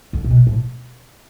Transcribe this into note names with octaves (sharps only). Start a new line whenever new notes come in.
D3
A2
B2
A2